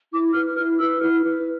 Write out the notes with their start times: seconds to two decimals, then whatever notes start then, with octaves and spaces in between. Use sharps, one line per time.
0.11 E4 D6
0.33 B4 F6
0.56 E4 F6
0.79 B4 E6
1.01 E4 F6
1.24 B4